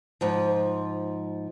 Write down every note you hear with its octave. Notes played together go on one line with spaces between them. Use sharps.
G#2 F3